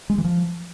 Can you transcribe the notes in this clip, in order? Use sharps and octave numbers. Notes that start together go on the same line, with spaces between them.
G#3
E3
F3